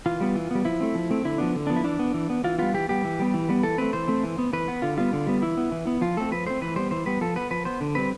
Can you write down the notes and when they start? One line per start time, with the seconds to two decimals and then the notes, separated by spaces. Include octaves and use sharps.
0.06 E3 F4
0.21 G3 B3
0.36 E3
0.51 G3 B3
0.65 F3 E4
0.81 A3 C4
0.95 F3
1.11 A3 C4
1.25 D3 E4
1.38 F3 B3 D4
1.55 D3
1.67 F3 B3 D4
1.76 E4
1.84 E3 D4
1.99 B3
2.14 E3
2.30 B3
2.44 E3 F4
2.58 G3 B3 F4
2.74 E3 G4
2.89 G3 B3 G4
3.04 E3
3.19 G3 B3
3.34 E3
3.49 G3 B3
3.63 E3 A4
3.78 A3 C4 B4
3.93 E3 C5
4.08 A3 C4
4.23 E3
4.38 B3
4.53 E3 B4
4.68 B3
4.82 D3 F4
4.97 G3 B3 F4
5.13 D3
5.27 G3 B3
5.42 E3 E4
5.57 B3
5.72 E3
5.87 B3
6.01 F3 F4
6.17 A3 C4 A4
6.32 F3 B4
6.47 A3 C4 C5
6.61 E3 B4
6.76 G3 B3 C5
6.91 E3 C5
7.06 G3 B3 B4
7.21 F3 A4
7.36 B3 B4
7.50 F3 B4
7.65 B3 C5
7.81 D3
7.95 G3 C4 B4